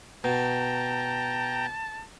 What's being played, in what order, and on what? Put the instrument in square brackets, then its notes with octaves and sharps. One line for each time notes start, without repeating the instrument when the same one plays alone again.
[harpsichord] B2 [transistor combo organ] G5 A#5 [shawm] A5